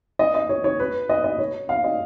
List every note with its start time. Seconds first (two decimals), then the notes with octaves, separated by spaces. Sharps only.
0.19 D#5
0.34 D#5
0.49 C#5
0.64 C#5
0.79 B4
1.09 D#5
1.24 D#5
1.39 C#5
1.69 F5
1.84 D#5